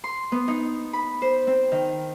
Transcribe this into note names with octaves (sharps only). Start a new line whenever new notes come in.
C6
B3
D#4
B5
C5
C4
D#3